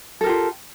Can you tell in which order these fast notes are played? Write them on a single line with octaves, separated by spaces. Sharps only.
A4 A#4 G4 F4